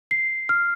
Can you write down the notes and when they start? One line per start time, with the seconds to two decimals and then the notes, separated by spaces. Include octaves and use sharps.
0.11 C7
0.49 F6